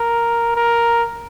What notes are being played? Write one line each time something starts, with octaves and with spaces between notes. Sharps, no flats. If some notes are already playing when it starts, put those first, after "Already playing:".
Already playing: A#4
A#4